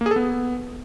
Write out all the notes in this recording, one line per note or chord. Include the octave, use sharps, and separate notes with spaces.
A#3
G#4
A4
B3